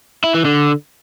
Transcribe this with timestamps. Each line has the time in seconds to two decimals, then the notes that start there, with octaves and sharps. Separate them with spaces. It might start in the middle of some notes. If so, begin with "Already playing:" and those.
0.24 E4
0.34 E3
0.45 D3